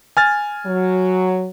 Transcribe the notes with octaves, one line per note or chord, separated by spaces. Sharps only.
G#5 F6 A6
F#3